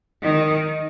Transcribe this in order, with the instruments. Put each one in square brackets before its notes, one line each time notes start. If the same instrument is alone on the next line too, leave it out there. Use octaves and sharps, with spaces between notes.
[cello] D#3